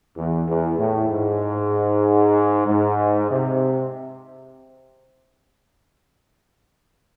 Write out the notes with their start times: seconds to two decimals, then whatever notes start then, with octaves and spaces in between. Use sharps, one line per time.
0.15 E2
0.46 E2
0.78 A2
1.09 G#2
2.66 G#2
3.29 C3